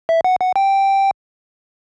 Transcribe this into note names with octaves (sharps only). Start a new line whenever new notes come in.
E5
F#5
F#5
G5